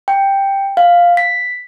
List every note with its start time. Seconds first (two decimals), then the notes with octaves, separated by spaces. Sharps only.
0.08 G5
0.77 F5
1.17 B6